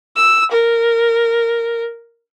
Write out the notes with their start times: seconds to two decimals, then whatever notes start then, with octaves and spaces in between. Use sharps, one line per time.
0.16 E6
0.52 A#4